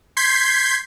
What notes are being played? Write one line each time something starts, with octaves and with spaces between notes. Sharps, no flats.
C6 G6 G#6 B6 C7